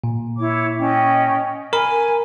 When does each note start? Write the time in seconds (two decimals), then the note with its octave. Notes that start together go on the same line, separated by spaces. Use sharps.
0.04 A#2
0.37 E4 C#5 D6
0.80 C#4 D#5 G5
1.73 A#4 G#5 B5